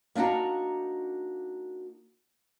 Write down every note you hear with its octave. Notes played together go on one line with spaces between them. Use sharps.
A#3 D4 D#4 F#4 A#5